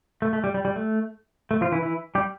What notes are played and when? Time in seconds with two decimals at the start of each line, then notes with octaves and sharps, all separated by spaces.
0.22 A3
0.33 A3
0.44 G3
0.54 G3
0.65 G3
0.76 A3
1.51 A3
1.61 F3 F4
1.72 E3 E4
1.82 E3 E4
2.15 G3 G4